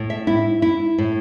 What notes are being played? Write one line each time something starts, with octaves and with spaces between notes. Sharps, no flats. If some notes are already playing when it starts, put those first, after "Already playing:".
Already playing: A2
E5
E4
E4
A2